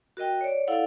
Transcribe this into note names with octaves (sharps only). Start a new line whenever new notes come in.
F#4 A#4 D#5 G5
C#5 D5
E4 A4 D5 F5 F#5